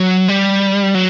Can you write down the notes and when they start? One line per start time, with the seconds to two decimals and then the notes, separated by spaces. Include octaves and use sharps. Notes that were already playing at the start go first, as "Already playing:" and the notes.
Already playing: F#3
0.28 G3
0.95 F#3